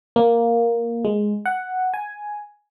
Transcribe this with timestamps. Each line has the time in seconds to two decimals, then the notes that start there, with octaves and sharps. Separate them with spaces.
0.16 A#3
1.05 G#3
1.46 F#5
1.94 G#5